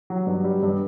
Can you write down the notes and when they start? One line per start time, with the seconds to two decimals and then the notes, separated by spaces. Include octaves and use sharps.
0.10 F#3
0.27 G2
0.45 G3
0.62 G2